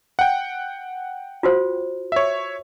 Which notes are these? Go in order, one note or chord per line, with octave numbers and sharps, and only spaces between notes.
F#5 G5
F4 F#4 C5
C#5 E5